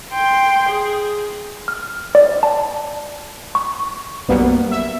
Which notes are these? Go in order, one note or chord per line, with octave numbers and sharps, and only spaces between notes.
G5 C6
G#4
F6
D5
A5
C#6
B1 F#2 G3 A#3 B3
E5